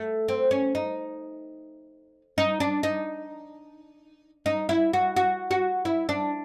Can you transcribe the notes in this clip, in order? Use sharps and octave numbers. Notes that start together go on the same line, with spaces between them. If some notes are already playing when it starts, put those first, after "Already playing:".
Already playing: A3
C4
C#4
D#4
D#4
D4
D#4
D#4
E4
F#4
F#4
F#4
E4
D4